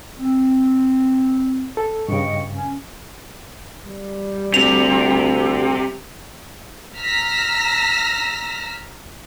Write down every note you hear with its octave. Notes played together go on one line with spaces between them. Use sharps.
C4
A4
G2 C#3 D#5 G5 C#6
C#4
G3
D2 C3 F7
A#5 E6 F6 A#6 B6